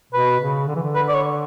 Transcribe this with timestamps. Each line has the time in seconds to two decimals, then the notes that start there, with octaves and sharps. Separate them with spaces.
0.13 B2 B4
0.40 C#3
0.68 D3
0.76 E3
0.83 D3
0.95 B4
1.08 D5
1.15 C#5